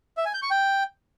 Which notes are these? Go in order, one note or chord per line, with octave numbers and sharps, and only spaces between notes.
E5
G#5
G6
C#6
G5